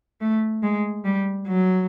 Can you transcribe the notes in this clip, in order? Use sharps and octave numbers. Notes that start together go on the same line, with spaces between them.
A3
G#3
G3
F#3